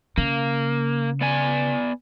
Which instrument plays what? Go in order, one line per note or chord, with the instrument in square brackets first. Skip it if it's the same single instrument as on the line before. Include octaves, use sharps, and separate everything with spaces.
[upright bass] C#3 [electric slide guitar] A#3
[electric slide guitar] B3 D5 G#5